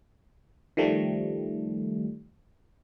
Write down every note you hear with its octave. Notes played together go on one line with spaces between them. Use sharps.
D#3 F3 G3 A3